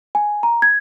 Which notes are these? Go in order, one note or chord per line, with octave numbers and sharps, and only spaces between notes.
G#5
A#5
G#6